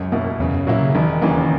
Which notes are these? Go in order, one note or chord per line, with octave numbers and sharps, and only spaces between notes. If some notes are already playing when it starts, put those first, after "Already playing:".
Already playing: C#2 F#2
B2 A#3 E4
E2 C#3
F#2
A#2 F#3 A#3 E4
C#3
E1 D#3
D#2 C#3 E3 A#3